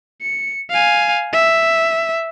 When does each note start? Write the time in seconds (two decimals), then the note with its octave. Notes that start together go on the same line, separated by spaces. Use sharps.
0.22 C#7
0.70 F5 G#5
1.33 E5